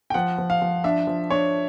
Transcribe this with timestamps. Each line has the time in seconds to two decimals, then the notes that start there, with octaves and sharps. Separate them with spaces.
0.10 G5
0.14 F3 F#5
0.38 F3
0.50 F5
0.62 F3
0.84 D4 E5
1.07 F3
1.30 D4 C#5